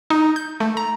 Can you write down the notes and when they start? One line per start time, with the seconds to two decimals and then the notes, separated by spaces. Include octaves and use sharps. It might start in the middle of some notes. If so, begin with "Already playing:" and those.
0.10 D#4
0.36 G6
0.60 A3
0.77 A#5